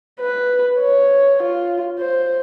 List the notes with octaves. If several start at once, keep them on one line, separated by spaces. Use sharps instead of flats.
B4
C#5
F4
C5